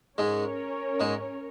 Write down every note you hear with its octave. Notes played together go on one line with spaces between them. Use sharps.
G#2 G#3 C#4 A#4 C#5
G#2 G#3